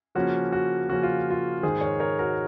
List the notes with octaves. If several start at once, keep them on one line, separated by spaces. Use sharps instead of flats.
C#3 F3 A#3 C#4 F#4
F#4
C#3 F3 A#3 C#4 F#4
F4
F4
G#2 D#3 G#3 D#4 G#4 C5
A#4 C#5
A#4 C#5
F#4 A#4